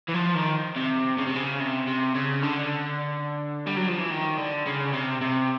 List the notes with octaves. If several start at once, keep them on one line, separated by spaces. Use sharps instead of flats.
E3
F3
D#3
C3
C#3
C3
C#3
C3
C3
C#3
D3
G3
F#3
F3
E3
D#3
D3
C#3
C3
C3